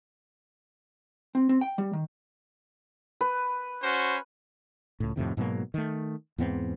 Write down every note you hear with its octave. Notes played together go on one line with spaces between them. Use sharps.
C4
C4
G5
G3
D#3
B4
C#4 F#4 C5
C#2 A2
F2 A2 C3 D#3
G#2 B2 F#3 A#3
D#3 A3
E2 G#2 B3 C4